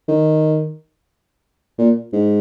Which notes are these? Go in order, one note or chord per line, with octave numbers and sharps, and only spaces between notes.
D#3
A#2
G#2